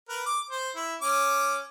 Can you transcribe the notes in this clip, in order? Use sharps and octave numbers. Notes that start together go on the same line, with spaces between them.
A#4 B4
D6
C5
E4
C#4 D6